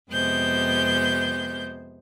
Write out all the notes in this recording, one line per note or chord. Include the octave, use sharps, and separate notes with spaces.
F2 C3 G#3 B3 C5 G6